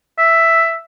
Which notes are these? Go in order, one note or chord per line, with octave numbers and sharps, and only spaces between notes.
E5